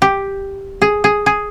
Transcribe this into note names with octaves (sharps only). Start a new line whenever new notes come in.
G4
G#4
G#4
G#4